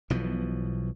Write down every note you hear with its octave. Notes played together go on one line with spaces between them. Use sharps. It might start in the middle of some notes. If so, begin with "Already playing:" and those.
B1 B2 E3 F3